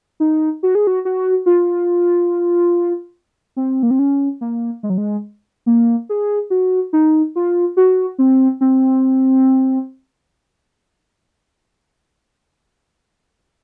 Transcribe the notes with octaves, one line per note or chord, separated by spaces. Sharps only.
D#4
F#4
G#4
F#4
F#4
F4
C4
A#3
C4
C#4
A#3
G#3
F#3
G#3
A#3
G#4
F#4
D#4
F4
F#4
C4
C4